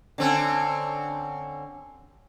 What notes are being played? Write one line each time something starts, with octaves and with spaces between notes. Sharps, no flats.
D3 C4 C#4